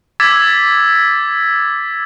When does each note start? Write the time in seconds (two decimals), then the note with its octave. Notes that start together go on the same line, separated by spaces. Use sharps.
0.20 D6 E6 G#6 A6 B6